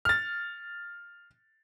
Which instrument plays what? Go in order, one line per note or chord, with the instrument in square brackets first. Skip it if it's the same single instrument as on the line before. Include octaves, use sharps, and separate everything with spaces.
[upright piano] F6 A6